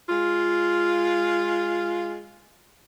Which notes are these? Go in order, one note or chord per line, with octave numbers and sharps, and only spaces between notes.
G#3 F4